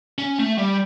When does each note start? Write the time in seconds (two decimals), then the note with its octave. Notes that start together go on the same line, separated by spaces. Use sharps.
0.18 C#4
0.39 A3
0.58 G3